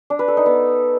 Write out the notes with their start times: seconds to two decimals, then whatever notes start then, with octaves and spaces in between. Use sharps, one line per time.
0.10 D4
0.19 B4
0.28 A4
0.37 D#4
0.46 B3